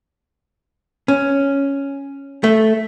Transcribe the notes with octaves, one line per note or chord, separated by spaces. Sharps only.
C#4
A3